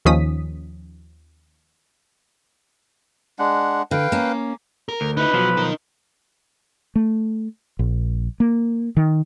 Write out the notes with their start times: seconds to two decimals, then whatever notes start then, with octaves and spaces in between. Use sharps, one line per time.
0.05 D#2 D#3 F3 C#4 D#6 B6
3.39 G#3 D4 F#5
3.91 D3 B4 F5 G5
4.12 A#3 C#4
4.89 A#4
5.01 D2
5.17 D#4 E4 B4
5.33 B1 F3 F#3
5.57 D#4 A#4
6.96 A3
7.79 A#1
8.40 A#3
8.97 D#3